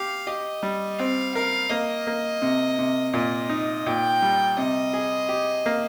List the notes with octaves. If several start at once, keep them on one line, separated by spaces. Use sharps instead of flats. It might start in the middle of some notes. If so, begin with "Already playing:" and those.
Already playing: G4 F5
G4 D#5
G3
C4 F5
A#4 F5
A#3 D#5
A#3
C3
C3
A#2 D#5
D#4
A#2 G5
G3
C3 D#5
G#4
G4
A#3